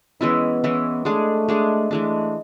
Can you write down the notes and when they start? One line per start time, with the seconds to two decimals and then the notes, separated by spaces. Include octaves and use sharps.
0.21 E3 G#3 B3 C#4 E4
0.64 E3 G#3 C#4 E4
1.05 G#3 A3 D4 G#4
1.49 G#3 D4 G#4
1.90 E3 G#3 A3 D4